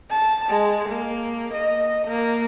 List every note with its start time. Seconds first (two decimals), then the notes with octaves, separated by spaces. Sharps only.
0.11 A5
0.50 G#3
0.89 A#3
1.54 D#5
2.08 A#3